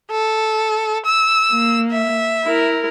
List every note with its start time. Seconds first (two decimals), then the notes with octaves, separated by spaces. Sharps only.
0.11 A4
1.05 E6
1.52 A#3
1.91 E5
2.44 E4 A#4